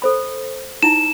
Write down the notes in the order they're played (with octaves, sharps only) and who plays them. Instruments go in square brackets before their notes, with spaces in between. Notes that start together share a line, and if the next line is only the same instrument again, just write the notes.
[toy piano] A4 C5 B5
[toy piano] D#4 E4 A#5 [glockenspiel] E7